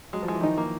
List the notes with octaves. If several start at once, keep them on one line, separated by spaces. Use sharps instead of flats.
F#3 G#3
F3
E3 G#3
D#3 F3 D#4
A#3